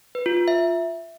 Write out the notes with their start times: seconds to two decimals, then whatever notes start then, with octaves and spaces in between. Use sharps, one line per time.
0.15 B4
0.26 F4
0.37 F4
0.48 E5